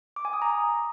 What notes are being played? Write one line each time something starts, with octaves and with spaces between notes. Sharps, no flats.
D6
G#5
D#6
A#5